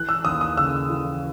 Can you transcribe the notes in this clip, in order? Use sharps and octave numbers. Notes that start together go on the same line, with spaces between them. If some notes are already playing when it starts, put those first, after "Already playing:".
Already playing: E3 F#6
E6
D#2 D#6
D#6
C#3 E6
E3